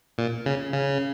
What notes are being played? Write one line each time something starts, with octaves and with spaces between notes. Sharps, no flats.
A#2
C#3
C#3